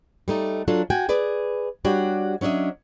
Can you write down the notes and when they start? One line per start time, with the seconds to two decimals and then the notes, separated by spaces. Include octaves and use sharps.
0.28 G3 A3 D#4
0.68 F#3 D4 F4 A4
0.90 F#4 G5 G#5
1.09 G#4 B4 D5
1.85 G3 D4 F#4 G4 C#5
2.41 F#3 C#4 D4 D#5 E5